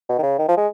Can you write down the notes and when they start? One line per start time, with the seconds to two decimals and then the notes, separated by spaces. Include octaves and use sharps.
0.09 B2
0.19 D#3
0.23 C#3
0.39 D#3
0.48 F3
0.57 G#3